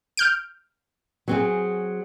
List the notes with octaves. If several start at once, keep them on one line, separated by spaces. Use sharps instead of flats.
F6 G6 D7
F#3 C4 G#4